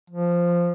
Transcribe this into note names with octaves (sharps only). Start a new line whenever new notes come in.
F3